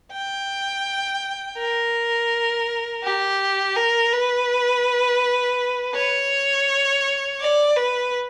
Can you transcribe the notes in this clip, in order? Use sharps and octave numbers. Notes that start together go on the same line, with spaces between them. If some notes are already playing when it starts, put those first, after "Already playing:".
G5
A#4
G4
A#4
B4
C#5
D5
B4